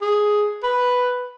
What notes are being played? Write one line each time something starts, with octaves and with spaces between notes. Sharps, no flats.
G#4
B4